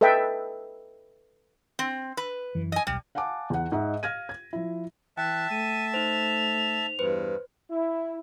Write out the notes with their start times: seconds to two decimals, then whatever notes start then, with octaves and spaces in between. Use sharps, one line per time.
0.01 A4 B4 D#5 E5 G5
1.79 C4
2.17 B4
2.55 F#2 E3
2.72 D#5 G#5
2.87 D#1 B1 G3
3.15 F5 F#5 G#5 A5 D6
3.50 E2 F#5
3.72 G#2 D#5 E5 F#5
4.03 F5 F6 G#6 A#6 D#7
4.29 G#6
4.53 F3 E4
5.17 E3 E5 G5 A5 F#6
5.51 A3 D#7
5.94 D#4 C5 F7
6.99 E2 G2 B4 C5
7.71 E4